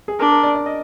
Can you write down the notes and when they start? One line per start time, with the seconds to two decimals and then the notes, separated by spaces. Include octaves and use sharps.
0.08 G#4
0.19 D4 A#4
0.31 A#4
0.43 D5
0.55 D5
0.66 D#5